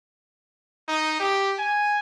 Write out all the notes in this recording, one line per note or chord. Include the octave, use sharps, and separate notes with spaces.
D#4
G4
G#5